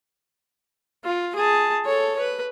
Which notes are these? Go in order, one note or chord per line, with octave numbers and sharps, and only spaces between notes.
F4
G#4 A5
A4 C#5
B4